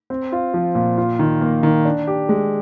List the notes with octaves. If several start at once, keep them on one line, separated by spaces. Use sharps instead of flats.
C4
F4
F3
A#2
F4
D#3
A#3
D#3
D4
G4
G#3